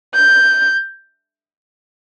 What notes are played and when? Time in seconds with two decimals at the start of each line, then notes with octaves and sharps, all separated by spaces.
0.15 G6